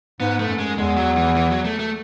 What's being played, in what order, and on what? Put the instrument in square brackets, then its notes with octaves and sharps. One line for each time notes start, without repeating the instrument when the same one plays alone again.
[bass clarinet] G#2 [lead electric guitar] B3
[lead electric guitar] A3
[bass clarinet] F#2
[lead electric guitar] G#3
[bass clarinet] E2 [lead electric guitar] G#3
[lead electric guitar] F#3
E3
E3
F#3
A3
A3